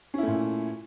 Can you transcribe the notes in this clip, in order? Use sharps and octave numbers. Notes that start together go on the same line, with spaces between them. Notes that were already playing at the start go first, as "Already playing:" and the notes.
A#2 A3 C#4 E4